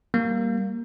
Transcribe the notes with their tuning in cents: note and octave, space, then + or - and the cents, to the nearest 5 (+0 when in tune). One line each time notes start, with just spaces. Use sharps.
G3 +0 A#3 +0